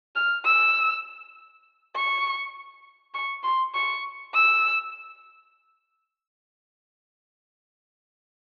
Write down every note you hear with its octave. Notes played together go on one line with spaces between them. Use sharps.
F6
E6
C#6
C#6
C6
C#6
E6